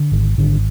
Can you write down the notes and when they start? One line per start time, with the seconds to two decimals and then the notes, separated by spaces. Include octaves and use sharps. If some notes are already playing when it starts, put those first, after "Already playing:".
Already playing: D3
0.12 G#1
0.38 G#1 D3